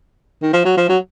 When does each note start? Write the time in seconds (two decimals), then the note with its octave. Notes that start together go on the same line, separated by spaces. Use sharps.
0.42 D#3
0.53 F3
0.65 F#3
0.78 F3
0.89 F#3